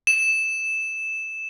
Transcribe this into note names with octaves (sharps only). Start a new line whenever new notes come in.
E7